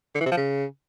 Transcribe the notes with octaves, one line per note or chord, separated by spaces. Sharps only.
D3
E3
C3
F3
C#3